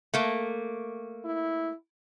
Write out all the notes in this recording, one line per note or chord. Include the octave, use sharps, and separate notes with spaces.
A3 A#3
E4